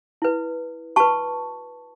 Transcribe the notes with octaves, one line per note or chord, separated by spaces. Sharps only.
E4 B4
F#4 B4 A5 C#6